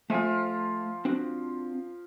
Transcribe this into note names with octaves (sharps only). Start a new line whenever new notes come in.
F3 A3 F4 E5 G#5
C4 D4 F#4